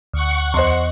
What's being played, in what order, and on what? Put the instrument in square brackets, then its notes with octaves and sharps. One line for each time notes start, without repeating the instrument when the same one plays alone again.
[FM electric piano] D2 [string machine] F#5 C#6
[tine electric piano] E2 D#5 [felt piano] C5 C6